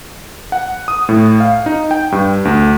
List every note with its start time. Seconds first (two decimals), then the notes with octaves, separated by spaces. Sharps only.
0.52 F#5
0.88 D#6
1.09 A2
1.40 F5
1.66 D#4
1.91 G5
2.12 G2
2.45 D2